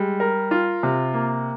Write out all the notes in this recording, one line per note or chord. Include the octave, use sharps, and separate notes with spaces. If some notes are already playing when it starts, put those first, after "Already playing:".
Already playing: G3 G#3
A#4
F4
C3
A#3